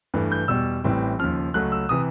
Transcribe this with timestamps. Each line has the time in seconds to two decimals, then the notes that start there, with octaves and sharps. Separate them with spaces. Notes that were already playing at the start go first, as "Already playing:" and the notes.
0.14 G2 E3 A3
0.32 G6
0.48 E2 B2 G3 E6
0.84 A1 A2 E3 G3 C4
1.19 D#2 C#3 F3 F6
1.54 C#2 C#3 F#3 A3 C#4 F#6
1.72 E6
1.89 C3 E3 D#6